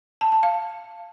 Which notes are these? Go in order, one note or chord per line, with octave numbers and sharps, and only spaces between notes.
A5
A5
F5